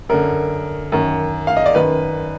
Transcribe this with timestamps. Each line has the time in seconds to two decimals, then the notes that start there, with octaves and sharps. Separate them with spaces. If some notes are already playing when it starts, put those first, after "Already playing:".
0.09 F#2 D3 A#4
0.92 F#2 D#3
1.47 F5
1.57 D#5
1.66 D5
1.75 F#2 D#3 B4